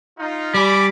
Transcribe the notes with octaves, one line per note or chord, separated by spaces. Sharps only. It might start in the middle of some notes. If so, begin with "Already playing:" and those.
D#4 F4
G3 G#5 B5 D6